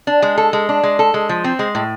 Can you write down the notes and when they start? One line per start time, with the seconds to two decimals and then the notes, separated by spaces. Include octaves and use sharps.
0.07 D4
0.22 G#3
0.38 A4
0.53 G#3
0.69 D4
0.83 G#3
0.99 A4
1.14 G#3
1.29 F3
1.44 C4
1.59 G#3
1.75 A2